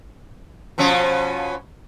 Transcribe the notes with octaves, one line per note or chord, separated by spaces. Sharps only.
B2 F3 C#4